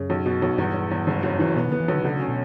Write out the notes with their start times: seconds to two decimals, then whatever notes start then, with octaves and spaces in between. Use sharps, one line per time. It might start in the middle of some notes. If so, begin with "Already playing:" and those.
Already playing: F#2 C#3
0.10 B1
0.26 B2
0.42 B1
0.58 E2 G2
0.74 E2
0.91 E2
1.07 F#1
1.23 F#2
1.39 E3
1.56 B2 B3
1.68 D3 B3
1.80 E3
1.88 B1 D3
2.04 D2 C#3
2.20 C#4
2.28 B2